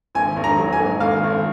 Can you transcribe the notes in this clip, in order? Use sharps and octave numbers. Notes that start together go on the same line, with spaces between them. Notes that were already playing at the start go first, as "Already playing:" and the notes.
G#1 G#5
G#1
A#5
F#3
G#5
G#2
G#1 F5
G#1